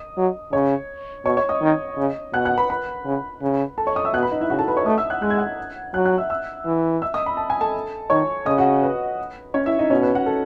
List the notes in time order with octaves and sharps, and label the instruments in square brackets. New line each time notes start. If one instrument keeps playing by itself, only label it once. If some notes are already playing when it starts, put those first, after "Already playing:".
Already playing: [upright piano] D#5 D#6
[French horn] F#3
[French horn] C#3 [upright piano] C#5 C#6
[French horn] B2 [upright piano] C#5 C#6
[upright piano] C#5 C#6
D#5 D#6
[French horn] D#3
C#3
[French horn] B2 [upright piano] F#5 F#6
[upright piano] F#5 F#6
B4 B5
B4 B5
[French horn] C#3
C#3
[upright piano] A4 A5
C#5 C#6
D#5 D#6
E5 E6
[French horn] B2 [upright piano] F#5 F#6
[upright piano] B4 B5
D#4 D#5
E4 E5
[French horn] C#3 [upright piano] F#4 F#5
[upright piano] A4 A5
B4 B5
C#5 C#6
[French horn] A3 [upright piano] D#5 D#6
[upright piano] E5 E6
F#5 F#6
[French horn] G#3 [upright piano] F#6
[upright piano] G#6
F#5 F#6
[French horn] F#3 [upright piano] F#5 F#6
[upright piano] F#5 F#6
E5 E6
E5 E6
[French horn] E3
[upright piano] E5 E6
D#5 D#6
B5
A5
G#5
A4 A5
[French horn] D#3 [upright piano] C#5 C#6
[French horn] C#3 [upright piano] D#5 D#6
[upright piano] F#4 F#5
B4
C#4 C#5
E4 E5
D#4 D#5
[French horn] B2 [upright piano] C#4 C#5
[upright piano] B4
F#4 F#5
A4